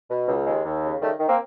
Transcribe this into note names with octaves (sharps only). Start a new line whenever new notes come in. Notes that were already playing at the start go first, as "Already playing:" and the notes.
B2
C#2
D#2 G#3
D#2
C#3
D#3 G3 A3
D#3
A#3 C4